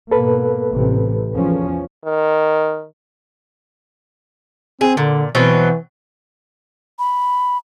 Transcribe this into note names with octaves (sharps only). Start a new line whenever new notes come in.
G#2 B2 A#3 A4 B4
A1 C3
E2 F3 C#4
D#3
C4 G#4
A#2 D3
B2 E3 F#3 C4
B5